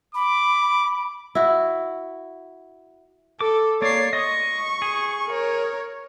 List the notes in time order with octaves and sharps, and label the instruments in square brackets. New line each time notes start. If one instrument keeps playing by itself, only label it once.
[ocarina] B5 [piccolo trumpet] D6
[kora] E4 F#4
[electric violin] A4 [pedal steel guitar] D6
[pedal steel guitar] A#3 D5 [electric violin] C#5 C7
[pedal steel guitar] D#5 C6 D#6 [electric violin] C#6
[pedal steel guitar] G#4
[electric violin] A#4 C#5